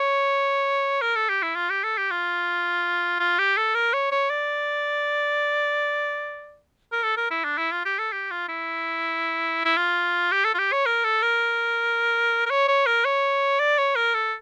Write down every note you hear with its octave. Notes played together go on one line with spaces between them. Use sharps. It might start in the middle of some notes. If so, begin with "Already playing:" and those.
Already playing: C#5
A#4
A4
G4
E4
F4
G4
A4
G4
F4
F4
G4
A4
A#4
C#5
C#5
D5
A#4
A4
A#4
E4
D4
E4
F4
G4
A4
G4
F4
E4
E4
F4
G4
A4
F4
G4
C#5
A#4
A4
A#4
A#4
C#5
C#5
A#4
C#5
D5
C#5
A#4
A4